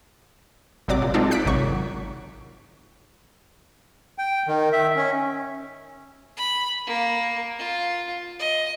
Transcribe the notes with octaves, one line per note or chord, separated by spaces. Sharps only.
G#1 C3 F#3 D5 D6
A#2
G#3 C4 D4 D#4 F4 A4
F#6 B6 D7
G#1 C3 D#3 F#3 C#6
G5
D#3
E5
C#4
B5
A#3
F4
D#5